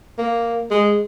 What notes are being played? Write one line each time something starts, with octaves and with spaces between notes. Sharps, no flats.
A#3
G#3